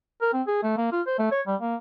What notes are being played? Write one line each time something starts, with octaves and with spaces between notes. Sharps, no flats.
A#4
C4
G#4
A3
A#3
F4
C5
A3
C#5
G3
A#3